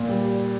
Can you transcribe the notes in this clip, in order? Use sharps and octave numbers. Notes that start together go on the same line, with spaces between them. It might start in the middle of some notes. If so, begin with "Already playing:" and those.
Already playing: A#2
G3